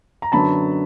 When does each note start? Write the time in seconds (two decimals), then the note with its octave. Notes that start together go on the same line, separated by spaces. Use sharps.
0.22 A#5
0.32 F#2 D3 F#3 B3 A5 B5